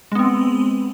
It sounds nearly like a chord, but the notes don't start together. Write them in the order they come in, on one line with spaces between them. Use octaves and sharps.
G#3 B3 C4